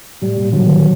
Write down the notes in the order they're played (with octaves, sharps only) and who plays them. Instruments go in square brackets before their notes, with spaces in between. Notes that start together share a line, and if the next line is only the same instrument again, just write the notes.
[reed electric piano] A2 [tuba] G3
[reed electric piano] A#2
[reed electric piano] D3 [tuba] F#3
[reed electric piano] D#3
E3